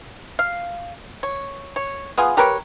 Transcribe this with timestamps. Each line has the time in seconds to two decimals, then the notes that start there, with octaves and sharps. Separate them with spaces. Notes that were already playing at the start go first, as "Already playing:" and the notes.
0.39 F5
1.23 C#5
1.76 C#5
2.18 B3 F4 G#4
2.37 G4 A#4 B4 C#5